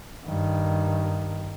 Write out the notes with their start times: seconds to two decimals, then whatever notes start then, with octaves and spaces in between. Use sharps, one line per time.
0.25 G2 D#3